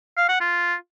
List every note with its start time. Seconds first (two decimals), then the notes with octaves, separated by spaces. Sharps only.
0.17 F5
0.29 F#5
0.41 F4